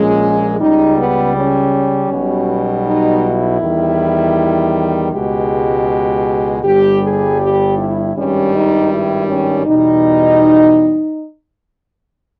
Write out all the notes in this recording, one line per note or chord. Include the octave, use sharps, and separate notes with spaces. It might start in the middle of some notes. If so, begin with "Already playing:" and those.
Already playing: A#1 A#2 G#3 C#4
C#2 C#3 G3 D#4
B3
C#4
B1 B2 G3
D#4
E4
E2 D#3 G3
C#2 B2 G#3 G4
G1 G2 G3 G4
G#4
G4
E4
G#1 G2 D#3 G3 C#4
D#4
E4
C#4
E2 B2 G3 D#4